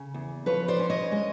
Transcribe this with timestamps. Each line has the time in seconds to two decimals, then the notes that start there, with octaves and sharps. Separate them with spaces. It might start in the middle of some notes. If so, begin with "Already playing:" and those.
Already playing: C#3
0.14 E2
0.46 F3 B4 C#5
0.68 C5 D5
0.79 C#4
0.90 C#5 D#5
1.12 G#3